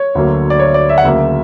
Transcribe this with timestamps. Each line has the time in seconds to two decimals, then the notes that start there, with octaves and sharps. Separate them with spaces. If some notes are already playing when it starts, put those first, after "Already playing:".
Already playing: C#5
0.15 D2 D3 F#3 A#3
0.50 D5
0.59 C#5
0.74 D5
0.89 E5
0.98 F#5
1.05 D2 C#3 F#3 A#3 E5